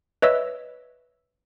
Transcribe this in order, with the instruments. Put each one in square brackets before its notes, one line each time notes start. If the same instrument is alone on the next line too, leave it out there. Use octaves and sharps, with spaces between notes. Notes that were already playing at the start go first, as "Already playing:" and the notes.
[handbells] B4 C#5 D#5 E5 E6